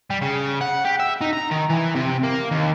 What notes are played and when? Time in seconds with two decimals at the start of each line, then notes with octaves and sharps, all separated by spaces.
0.10 G3
0.22 C#3
0.61 F#5
0.85 G4
0.99 E5
1.21 D#4
1.33 A#5
1.51 D#3
1.70 E3
1.96 C3
2.24 A#3
2.51 D#2